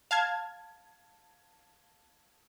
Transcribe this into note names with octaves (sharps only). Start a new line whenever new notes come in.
F5 A5 G#6